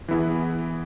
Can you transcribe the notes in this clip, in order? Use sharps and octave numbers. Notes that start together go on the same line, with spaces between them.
E3 B3 E4 G#4